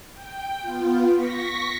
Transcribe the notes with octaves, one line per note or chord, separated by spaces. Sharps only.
G5
B3 F4
C#6 A#6 B6